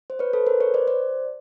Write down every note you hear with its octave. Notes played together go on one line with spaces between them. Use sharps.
C5
B4 C#5
A4 B4
A#4 C5
B4 C#5
C5 D5
C5 D5